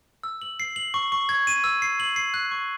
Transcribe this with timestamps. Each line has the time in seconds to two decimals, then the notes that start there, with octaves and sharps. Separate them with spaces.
0.23 E6
0.42 F#7
0.60 C7
0.76 F#7
0.94 C#6
1.12 C#6
1.29 G#6
1.47 D#7
1.64 E6
1.82 C7
2.00 F#7
2.16 C7
2.34 F#6
2.51 C#6